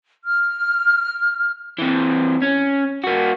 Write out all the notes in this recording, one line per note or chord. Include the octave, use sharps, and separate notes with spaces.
F6
E3 C4
C#4
A#3 F#4